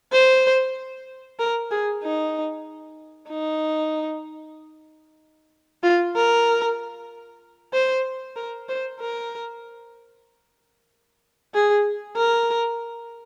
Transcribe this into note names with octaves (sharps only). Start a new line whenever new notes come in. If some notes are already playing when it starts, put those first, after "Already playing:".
C5
A#4
G#4
D#4
D#4
F4
A#4
C5
A#4
C5
A#4
G#4
A#4